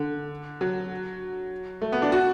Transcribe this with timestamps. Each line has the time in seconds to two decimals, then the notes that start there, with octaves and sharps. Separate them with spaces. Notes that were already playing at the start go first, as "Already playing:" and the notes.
Already playing: D3
0.61 F#3
1.81 A3
1.92 B3
2.02 D4
2.12 F#4